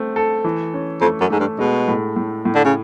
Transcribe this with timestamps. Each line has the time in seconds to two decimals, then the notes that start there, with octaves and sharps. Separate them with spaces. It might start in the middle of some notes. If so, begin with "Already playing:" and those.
Already playing: A3 C4
0.16 A4
0.44 E3
0.74 C#4
1.01 F2 A3
1.21 F#2
1.30 G#2 A3
1.39 G2
1.59 B2 G#3
1.88 A2
2.16 A2
2.45 A2
2.55 D3
2.64 C#3